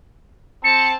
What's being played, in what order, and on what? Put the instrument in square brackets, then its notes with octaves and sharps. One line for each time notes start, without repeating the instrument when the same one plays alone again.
[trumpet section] C4 A5 [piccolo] C#7